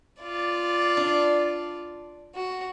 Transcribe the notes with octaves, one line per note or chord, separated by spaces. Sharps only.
F4 D5
D4
F#4